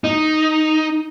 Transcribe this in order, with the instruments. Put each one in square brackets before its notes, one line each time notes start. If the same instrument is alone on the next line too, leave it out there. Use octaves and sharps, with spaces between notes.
[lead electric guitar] D#4